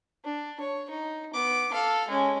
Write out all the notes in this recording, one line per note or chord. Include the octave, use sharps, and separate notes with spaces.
D4
C#5
D#4
B3 D6
A4 F5
G#3 C#4